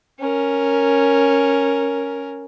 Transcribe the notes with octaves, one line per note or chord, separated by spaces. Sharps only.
C#4 A#4